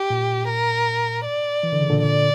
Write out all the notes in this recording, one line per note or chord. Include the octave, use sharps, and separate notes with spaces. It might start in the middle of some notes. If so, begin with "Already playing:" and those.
Already playing: G4
A#2
A#4
D5
E3
D3
C#3
A#2 D3
D5